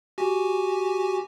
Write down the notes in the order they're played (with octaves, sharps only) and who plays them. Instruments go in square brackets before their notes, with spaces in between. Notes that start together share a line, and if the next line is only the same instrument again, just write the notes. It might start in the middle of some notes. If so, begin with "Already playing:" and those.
[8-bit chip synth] F#4 G4 G#5